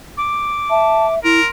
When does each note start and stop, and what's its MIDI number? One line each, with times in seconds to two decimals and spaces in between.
0.17 1.14 86
0.70 1.19 76
0.70 1.06 81
1.24 1.40 64
1.24 1.48 70
1.24 1.50 84